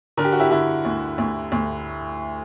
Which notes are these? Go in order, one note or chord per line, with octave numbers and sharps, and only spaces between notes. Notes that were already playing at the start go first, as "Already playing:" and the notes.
D3 A#4
G4
F#4
E4 G4
D3 E4 G4
D2
D2
D2